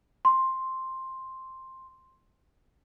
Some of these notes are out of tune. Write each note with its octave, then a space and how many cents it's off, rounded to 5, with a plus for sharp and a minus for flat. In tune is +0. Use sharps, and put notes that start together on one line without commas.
C6 +5